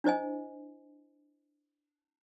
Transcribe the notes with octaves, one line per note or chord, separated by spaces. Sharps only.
D4 E4 C5 D#5 G#5